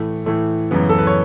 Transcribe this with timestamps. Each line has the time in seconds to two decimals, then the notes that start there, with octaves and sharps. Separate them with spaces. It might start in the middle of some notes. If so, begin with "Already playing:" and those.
Already playing: A2 E3 A3
0.26 A2 E3 A3
0.71 F#2 C#3 E3 B3
0.89 A4
0.98 B4
1.07 C#5